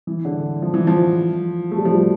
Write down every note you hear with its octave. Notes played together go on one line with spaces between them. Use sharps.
E3
D3
F3
E3
F3
A3
G3
F3
G3